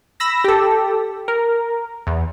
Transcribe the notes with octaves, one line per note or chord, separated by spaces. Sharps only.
B5 E6 A#6
G4 A4
A#4
E2